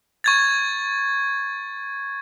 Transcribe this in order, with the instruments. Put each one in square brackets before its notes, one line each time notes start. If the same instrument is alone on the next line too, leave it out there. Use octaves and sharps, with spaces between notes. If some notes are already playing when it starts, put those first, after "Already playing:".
[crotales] C#6 G#6 A6